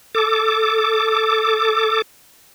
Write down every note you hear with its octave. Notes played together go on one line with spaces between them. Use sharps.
A4 D6